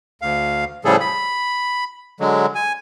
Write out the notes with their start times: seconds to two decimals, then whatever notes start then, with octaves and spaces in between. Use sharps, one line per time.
0.22 D2 F5
0.85 A2 C#3 F3 G3 G#4 A4
1.00 B5
2.20 D3 F#3 G#3
2.55 G#5